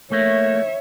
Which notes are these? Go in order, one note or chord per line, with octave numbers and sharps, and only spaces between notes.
A3 A#3 C#5 E5